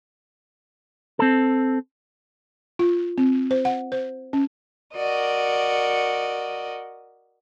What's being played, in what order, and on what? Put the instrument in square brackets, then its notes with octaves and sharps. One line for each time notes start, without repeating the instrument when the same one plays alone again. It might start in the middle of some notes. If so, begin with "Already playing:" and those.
[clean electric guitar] C4 A4
[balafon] F4
C4
C5
F#5
C5
C#4
[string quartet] F#4 A#4 D5 D#5